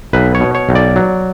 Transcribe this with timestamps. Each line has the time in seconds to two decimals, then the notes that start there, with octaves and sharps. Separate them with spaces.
0.13 B1 B4
0.35 C#5
0.40 B2
0.55 C#5
0.69 B1
0.75 D5
0.96 F#3